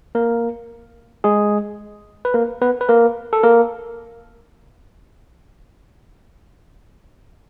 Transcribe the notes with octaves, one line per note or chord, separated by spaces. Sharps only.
A#3 A#4
G#3 G#4
B4
A#3 A#4
B3 B4
B4
A#3 A#4
A4
A#3 A#4